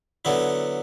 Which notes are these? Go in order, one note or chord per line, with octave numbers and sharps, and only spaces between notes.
D3 F#3 B3 E4